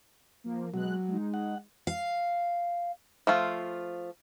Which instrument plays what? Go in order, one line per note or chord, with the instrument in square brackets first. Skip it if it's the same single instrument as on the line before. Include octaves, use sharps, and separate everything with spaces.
[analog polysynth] F3 A#3
[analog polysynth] B2 G#3 F#6 [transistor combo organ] F#3
[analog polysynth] G#3 D#4
[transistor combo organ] F#5
[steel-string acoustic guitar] F5
[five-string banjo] F3 A3 F4